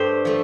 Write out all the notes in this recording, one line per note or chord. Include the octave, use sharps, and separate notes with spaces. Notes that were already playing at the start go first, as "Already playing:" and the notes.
Already playing: G2 A3 G4 C5
F3 A3